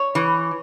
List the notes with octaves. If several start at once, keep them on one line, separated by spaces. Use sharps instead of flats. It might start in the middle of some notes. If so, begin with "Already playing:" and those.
Already playing: C#5
E3